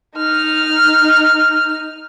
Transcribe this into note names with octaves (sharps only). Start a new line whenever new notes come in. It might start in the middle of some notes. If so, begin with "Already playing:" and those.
D#4 F6